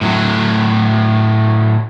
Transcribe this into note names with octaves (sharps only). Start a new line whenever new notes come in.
A2 F#3